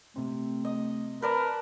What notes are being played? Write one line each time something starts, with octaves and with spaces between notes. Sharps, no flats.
C3 A3 C4
D#5
A#4 B4 D5 A5